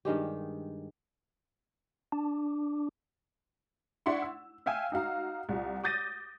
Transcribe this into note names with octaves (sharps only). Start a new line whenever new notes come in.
G2 D#3 G#3 G4
D4
D4 E4 F#5 C6 C#6
E6
E5 F5 G5 G#5 E6
D#4 F#4 F5 A#5
C2 F4
D6 D#6 G6 A6 A#6 D#7